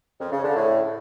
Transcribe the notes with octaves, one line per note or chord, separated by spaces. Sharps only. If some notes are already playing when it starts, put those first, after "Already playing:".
F2
C#3
D3
A2